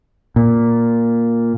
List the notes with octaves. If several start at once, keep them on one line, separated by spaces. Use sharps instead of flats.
A#2